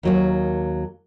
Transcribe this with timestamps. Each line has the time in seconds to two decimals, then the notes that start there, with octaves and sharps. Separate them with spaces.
0.03 D#2 F#3 A#3